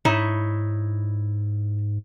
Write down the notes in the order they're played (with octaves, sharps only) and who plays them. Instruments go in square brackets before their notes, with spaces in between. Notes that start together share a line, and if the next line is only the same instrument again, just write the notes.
[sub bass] G#2 [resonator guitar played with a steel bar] D#4 E4 C#5